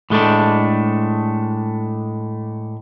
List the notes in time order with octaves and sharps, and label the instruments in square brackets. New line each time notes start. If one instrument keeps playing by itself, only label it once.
[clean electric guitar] A2 G#3 A3 D4